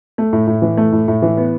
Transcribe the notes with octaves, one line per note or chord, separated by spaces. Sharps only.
A3
A2
A2
E3
A3
A2
A2
E3
B3